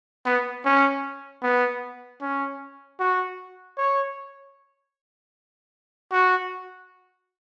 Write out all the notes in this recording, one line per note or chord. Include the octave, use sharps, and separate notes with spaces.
B3
C#4
B3
C#4
F#4
C#5
F#4